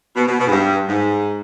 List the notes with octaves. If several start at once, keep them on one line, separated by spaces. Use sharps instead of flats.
B2
B2
B2
G#2
G2
G#2